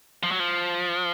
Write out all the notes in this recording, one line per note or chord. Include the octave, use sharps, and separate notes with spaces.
F3
F#3
F3